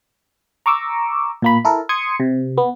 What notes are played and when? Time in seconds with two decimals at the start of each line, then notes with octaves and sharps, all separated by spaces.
0.66 A#5 C#6 D6 E6
1.42 A#2 A#3 B5
1.65 E4 A4 A#4
1.89 C6 D#6 G#6 C#7
2.20 C3
2.58 B3